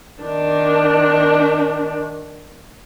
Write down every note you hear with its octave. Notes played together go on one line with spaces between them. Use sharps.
D#3 D4